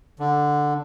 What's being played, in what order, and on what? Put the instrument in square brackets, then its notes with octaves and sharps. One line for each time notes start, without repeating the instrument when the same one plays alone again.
[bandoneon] D3